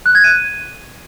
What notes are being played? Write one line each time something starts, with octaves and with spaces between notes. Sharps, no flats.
F#6
G#6
D#7